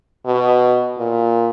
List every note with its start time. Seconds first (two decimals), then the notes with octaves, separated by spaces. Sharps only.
0.26 B2
0.98 A#2